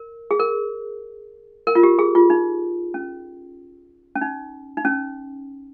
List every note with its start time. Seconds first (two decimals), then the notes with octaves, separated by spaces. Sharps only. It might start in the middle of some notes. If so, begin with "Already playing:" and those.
Already playing: A#4
0.31 G#4
0.40 A#4
1.67 A#4
1.75 F4
1.83 G4
1.99 G#4
2.15 F4
2.30 D#4
2.94 C#4
4.16 C#4
4.21 D#4
4.77 D#4
4.85 C#4